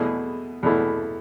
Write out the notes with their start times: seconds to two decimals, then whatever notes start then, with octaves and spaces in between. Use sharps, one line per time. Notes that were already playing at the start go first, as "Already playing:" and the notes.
Already playing: E2 B2 A3 E4 G#4
0.63 E2 B2 A3 E4